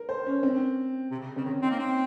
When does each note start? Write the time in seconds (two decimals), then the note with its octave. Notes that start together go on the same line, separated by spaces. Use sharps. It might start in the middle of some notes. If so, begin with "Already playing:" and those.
Already playing: A#4
0.09 C5
0.27 C#4
0.43 C4
1.11 C3
1.19 C#3
1.36 C#3 C4
1.45 D#3 C#4
1.62 C4 D#4
1.71 A#3
1.79 C4